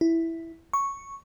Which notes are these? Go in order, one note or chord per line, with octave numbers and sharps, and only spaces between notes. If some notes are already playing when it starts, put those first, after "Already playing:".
E4
C#6